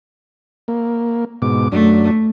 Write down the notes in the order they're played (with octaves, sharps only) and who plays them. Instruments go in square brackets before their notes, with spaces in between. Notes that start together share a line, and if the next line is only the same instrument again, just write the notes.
[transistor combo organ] A#3
G#2 B2 D6
[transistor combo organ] F#2 D4 [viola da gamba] A3